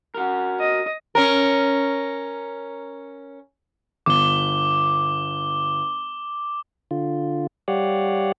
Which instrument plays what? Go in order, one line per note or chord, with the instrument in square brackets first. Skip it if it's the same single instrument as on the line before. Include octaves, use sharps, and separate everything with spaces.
[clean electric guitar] F#4 A#4
[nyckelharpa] D#5
[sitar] C#4 A#4
[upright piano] G1 [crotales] D6 G7
[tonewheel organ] D3 F4
G3 G4 C#5 D5 F5 F#5